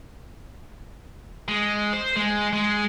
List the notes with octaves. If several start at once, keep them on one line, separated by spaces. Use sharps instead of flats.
G#3
C5
G#3
G#3